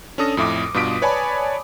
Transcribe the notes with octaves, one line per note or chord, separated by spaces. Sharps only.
C#4 D4 A4 D#6 A#6
F2 A2 E5 D6
G2 B2 F4 D#6 B6 D7
B4 C#5 D5 G#5 A5 B5